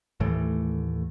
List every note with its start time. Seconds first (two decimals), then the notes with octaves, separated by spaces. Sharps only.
0.20 D#2 A2 E3 A3